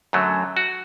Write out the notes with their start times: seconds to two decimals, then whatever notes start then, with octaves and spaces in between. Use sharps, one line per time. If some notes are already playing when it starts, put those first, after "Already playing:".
0.13 F#2 D3 F#3 A3
0.57 F#4